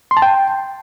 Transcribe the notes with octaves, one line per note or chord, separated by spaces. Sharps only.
C6
A5
G5